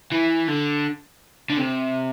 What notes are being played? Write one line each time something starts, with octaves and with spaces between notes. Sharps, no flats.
E3
D3
D3
C3